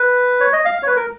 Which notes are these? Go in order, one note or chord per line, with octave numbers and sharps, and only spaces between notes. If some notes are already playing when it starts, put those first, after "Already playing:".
Already playing: B4
C#5
D#5
F5
C#5
B4
A#4